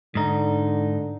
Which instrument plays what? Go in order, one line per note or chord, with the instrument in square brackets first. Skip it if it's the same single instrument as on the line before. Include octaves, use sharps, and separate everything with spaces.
[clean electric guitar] G#2 D#4 [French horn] D3